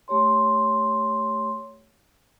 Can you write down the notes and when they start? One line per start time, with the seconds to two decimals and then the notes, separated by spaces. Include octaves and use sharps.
0.08 A3 G4 C#5 C6